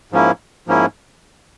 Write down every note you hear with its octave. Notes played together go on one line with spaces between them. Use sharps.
G#2 F3 A#3 C#4 E4
G#2 F3 A#3 C#4 E4